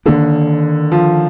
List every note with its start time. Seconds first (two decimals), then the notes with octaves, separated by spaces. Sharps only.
0.06 D3 D#3 A#3 D4
0.92 F3